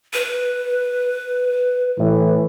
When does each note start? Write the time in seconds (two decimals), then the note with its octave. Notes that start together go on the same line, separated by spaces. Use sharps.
0.13 B4
2.00 A2 E3